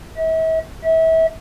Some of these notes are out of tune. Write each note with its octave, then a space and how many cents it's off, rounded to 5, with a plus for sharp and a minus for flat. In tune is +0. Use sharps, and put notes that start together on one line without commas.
E5 -40
E5 -30